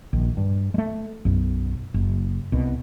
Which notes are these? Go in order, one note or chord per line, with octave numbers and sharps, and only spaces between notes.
A#1 D#3
G2
G#3 A3
B1 F#2
F#1
C2 B2